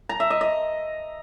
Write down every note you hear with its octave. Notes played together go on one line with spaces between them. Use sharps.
A#5
E5
D#5
D#5